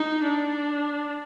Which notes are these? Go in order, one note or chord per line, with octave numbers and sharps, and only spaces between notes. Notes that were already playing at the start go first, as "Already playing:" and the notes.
Already playing: D#4
D4